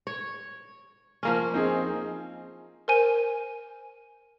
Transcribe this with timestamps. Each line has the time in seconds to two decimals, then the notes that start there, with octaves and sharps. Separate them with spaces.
0.07 C#5
1.23 F3 A#3 C#4
1.54 C4 D#4 G#4
2.88 A#4 C5 G#5 D#7